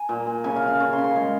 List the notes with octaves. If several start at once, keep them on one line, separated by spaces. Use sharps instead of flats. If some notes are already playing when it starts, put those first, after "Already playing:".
Already playing: G#5 A#5
A#2
A#2
C#3 G#5
F5
C#3
F5
C#3 C#5
C6
C#3
C6
G#3